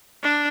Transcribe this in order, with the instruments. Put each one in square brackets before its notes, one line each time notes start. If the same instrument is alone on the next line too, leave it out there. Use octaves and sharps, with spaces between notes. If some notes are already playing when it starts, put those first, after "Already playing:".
[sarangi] D4